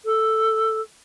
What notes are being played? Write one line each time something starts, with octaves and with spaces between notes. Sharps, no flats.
A4